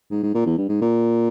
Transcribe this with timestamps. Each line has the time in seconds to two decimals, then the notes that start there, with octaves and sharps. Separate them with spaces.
0.11 G#2
0.23 G#2
0.34 A#2
0.46 E2
0.58 G2
0.69 G#2
0.81 A#2